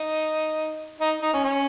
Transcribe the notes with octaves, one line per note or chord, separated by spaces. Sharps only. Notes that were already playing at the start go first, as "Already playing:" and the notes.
Already playing: D#4
D#4
D#4
C#4
C#4